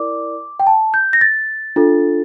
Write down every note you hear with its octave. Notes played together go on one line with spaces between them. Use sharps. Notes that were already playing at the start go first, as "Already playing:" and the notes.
Already playing: E4 A#4 D5 D6
G5
A5
G6
A#6
A6
D4 F4 A4